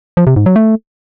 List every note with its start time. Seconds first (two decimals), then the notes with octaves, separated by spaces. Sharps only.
0.17 F3
0.27 C3
0.36 G#2
0.46 F#3
0.56 A3